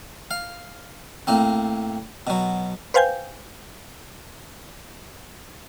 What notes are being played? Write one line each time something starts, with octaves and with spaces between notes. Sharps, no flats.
F5
A2 A#3 C4
B2 F#3
B4 C5 F5 G5 G#5 G6